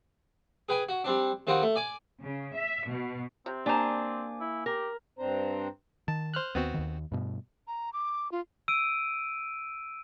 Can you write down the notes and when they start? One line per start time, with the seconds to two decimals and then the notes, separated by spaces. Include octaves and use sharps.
0.69 G#4 B4 G5 G#5
0.89 F#4
1.04 G3 C4 D4
1.47 D#3 G3 C4 F4 F#4
1.63 A3
1.76 D5 G#5 D6
2.21 C#3
2.54 E5
2.90 B2
3.46 C3 C4
3.66 A#3 D4 G4 C5 G#5 A#5 D6
4.41 E4
4.66 G4 A#4
5.19 G2 C4 D4 C5 A#5
6.08 D#3 A5
6.34 C5 F6 F#6
6.55 D#2 D#3 B3 C4 F#4
6.74 D#2 D#3
7.12 G2 B2
7.67 A#5
7.93 D6
8.32 F4
8.68 E6 D7 D#7